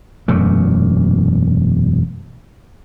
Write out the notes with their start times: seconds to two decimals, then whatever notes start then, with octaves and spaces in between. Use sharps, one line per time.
0.28 E1 F#2 A#2 A3